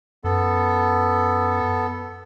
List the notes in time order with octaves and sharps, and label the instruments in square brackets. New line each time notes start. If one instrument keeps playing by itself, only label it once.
[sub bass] F#2 [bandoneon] B3 A4